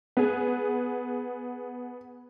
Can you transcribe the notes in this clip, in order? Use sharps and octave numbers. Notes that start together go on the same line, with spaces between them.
B3 G#4